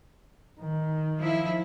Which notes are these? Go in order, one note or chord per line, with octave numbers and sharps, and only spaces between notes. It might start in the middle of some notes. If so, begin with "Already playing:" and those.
D#3
F3 E4